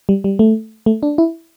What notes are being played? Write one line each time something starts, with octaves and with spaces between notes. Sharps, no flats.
G3
G3
A3
A3
D4
E4